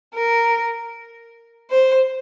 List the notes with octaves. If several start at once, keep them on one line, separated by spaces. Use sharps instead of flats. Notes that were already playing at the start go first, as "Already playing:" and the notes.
A#4
C5